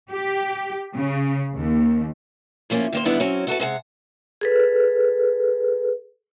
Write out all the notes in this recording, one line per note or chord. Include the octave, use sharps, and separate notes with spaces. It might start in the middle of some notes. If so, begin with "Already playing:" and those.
G4
C#3
D#2
A2 F3 A#3 C#4
D#3 A#3 C5
D3 D#3 G3 B3 D4 E4
F#3 C4 C#4
E4 F#4 A4 B4
C3 G#3 F#5
G#4 A4 B4